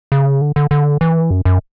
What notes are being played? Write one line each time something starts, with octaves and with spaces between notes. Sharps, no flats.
C#3
D3
D3
D3
E3
F#2
F#2